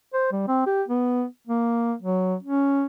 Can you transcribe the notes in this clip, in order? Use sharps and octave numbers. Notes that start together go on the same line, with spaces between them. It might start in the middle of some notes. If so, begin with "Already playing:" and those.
C5
G3
C4
G4
B3
A#3
F#3
C#4